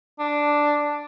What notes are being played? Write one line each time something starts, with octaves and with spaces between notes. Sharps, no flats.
D4